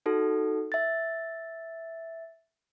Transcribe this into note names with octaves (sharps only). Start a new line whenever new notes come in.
D#4 F#4 A4
E5 A6